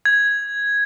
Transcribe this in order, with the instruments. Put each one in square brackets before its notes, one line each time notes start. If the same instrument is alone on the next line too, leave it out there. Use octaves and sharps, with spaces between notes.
[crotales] G#6